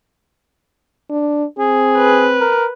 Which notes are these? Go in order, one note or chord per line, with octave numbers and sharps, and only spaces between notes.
D4
C4 G#4
B4
A#4